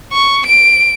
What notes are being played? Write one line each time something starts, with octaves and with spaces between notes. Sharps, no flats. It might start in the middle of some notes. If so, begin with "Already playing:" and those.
C#6
D7